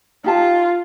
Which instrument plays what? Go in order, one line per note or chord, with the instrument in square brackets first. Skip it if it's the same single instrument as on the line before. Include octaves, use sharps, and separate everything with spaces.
[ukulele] D#4 G4 A5 [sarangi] F4